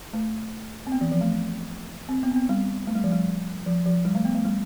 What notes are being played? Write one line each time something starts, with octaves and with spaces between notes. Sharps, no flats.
A3
C4
B3
E3
F3
A3
C4
B3
C4
B3
G3
A3
G3
F3
G3
F3
F3
G3
A3
B3
A3
G3